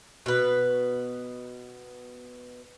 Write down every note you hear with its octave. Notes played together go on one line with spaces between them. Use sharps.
B2 B4